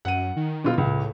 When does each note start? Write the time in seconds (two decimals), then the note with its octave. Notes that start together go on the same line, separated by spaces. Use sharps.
0.05 F#2 F#5 D#7
0.36 D#3
0.64 B2 F4
0.78 C#2 A2